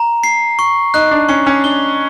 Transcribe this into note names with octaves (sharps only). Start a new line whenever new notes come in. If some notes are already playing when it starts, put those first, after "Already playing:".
Already playing: A#5
C7
C#6
D#4 F#6
D4
C#4 C#6
C#4
D4 G7